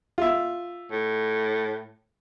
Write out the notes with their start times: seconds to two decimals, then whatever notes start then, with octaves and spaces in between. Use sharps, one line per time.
0.18 F4 E5
0.92 A2